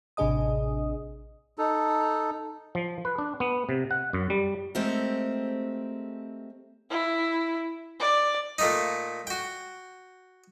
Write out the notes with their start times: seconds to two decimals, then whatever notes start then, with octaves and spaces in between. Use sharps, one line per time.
0.17 A1 C3 D4 G#4 D#5 D#6
1.58 D#4 A4
2.75 F3
3.05 B4
3.18 D4
3.40 B3
3.69 C3
3.91 F#5
4.13 F#2
4.30 G3
4.75 G#3 A3 C4 G4 A4 A#4
6.90 E4
8.00 D5
8.58 A#2 A3 D#4
9.27 F#4 G5